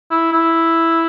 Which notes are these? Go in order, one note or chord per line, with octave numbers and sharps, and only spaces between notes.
E4
E4